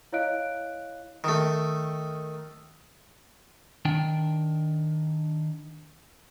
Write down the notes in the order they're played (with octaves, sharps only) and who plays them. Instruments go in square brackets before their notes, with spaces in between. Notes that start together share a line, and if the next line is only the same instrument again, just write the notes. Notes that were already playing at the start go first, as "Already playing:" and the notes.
[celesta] E4 C#5 D#5 F5 F#6 D7
[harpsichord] D#3 A3
[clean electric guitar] D#3 D4 G5